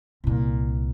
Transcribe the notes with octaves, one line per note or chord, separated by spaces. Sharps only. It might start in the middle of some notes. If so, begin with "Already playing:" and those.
C2 A#2